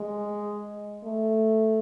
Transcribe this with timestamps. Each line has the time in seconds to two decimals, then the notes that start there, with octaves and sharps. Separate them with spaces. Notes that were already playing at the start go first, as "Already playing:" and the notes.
Already playing: G#3
1.04 A3